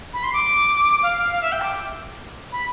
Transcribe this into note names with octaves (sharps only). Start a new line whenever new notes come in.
B5
C6
D6
F5
F5
F5
E5
G5
D6
B5